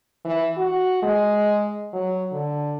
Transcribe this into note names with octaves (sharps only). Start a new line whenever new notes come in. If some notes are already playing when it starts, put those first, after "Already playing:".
E3
F#4
G#3
F#3
D3